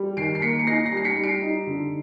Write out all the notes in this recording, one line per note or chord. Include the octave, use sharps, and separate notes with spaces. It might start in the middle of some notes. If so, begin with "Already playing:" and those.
Already playing: G3
D#3 C7 D7
C7
A#3 B6 C#7
C#7
D#4 A#6 C7
A#6 C7
G3
C7
B6 C#7
G3
C7 D7
D#4
D3